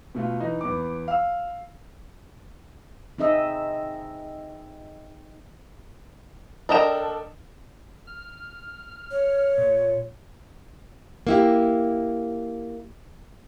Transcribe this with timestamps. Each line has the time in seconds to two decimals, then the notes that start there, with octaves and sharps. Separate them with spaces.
0.15 B2 A3 F4
0.40 E3 D#4
0.61 E2 B3 D6
1.08 F5 E6
3.18 C4 D#4 G#4 D#5 E5
6.69 D4 A4 A#4 D#5 G5 E7
8.07 F6
9.11 C#5
9.58 A#2
11.27 A#3 E4 G4